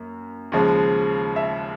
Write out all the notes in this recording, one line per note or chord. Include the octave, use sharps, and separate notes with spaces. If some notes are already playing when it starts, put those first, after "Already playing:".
Already playing: F#2 A#3
D#2 C#3 F3 G#3
E5